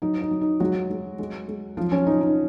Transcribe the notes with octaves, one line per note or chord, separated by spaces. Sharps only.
F#3 D#4
D#4
F#3
D#4
F#3 G#3 F#4
G#3
G#3
G#3
F3 F#3 F4
C#4
F#3 D#4
D#4